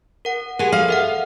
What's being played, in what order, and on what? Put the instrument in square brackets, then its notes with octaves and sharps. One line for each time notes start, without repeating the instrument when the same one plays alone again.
[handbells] A#4 F#5
[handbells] G4 G#4 A#4 [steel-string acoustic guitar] F#5 G#5
[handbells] A4 [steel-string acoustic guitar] F5
[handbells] A#4 E5 F#5